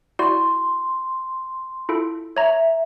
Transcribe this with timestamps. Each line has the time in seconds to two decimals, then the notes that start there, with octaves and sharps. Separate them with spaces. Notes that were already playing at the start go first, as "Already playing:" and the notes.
0.19 E4 F#4 D5 C6
1.89 E4 F4 A4
2.37 C#5 E5 A#5